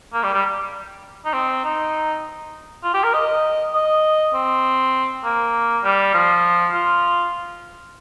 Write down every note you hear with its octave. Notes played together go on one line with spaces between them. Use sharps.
A#3
G3
G3
D#4
C4
D#4
F4
G4
A#4
D#5
D#5
C4
A#3
G3
F3
F4